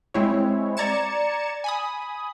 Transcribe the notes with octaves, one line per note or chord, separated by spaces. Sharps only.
G#3 C4 E4 C#5
D5 A#5 G#6 A6 C#7 E7
G#5 B5 D#6